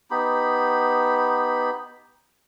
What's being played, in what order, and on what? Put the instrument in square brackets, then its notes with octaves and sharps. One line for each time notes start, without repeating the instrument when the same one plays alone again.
[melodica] B3 D#4 G4 B5